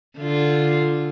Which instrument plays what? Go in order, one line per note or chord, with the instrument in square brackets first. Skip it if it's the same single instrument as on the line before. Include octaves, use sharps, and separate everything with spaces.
[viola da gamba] D3 F4